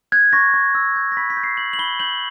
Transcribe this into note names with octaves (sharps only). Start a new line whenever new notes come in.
F#6 G#6
C#6 A#6
C#6
E6
G6
A#6
B5 B6
B6
G6
C7
G6 F#7
F#7
B5 G7
G6 F#7